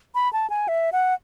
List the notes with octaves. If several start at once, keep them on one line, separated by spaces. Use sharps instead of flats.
B5
A5
G#5
E5
F#5